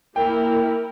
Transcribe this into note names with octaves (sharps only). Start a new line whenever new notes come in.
A#3 E4 A#4 G5